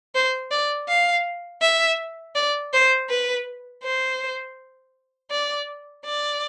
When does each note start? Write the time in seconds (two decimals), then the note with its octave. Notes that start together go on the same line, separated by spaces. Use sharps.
0.15 C5
0.51 D5
0.89 F5
1.61 E5
2.35 D5
2.73 C5
3.10 B4
3.83 C5
5.31 D5
6.05 D5